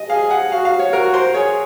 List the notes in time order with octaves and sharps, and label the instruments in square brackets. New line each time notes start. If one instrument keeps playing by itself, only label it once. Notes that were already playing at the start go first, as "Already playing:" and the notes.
Already playing: [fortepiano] D#5
[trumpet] G#4 [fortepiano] F5
[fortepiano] F#5
[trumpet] F#4 [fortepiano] F5
[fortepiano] F5
C#5
[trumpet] F#4 [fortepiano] A#4
[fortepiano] C5
[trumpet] G#4 [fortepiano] C#5